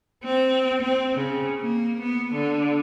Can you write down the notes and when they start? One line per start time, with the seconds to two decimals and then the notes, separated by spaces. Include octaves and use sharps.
0.24 C4
0.82 C4
1.14 C#3
1.59 A#3
2.01 B3
2.33 D3